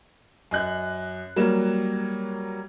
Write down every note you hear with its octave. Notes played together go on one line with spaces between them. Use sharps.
F#2 D#5 F#6
F#3 G3 A#3 E7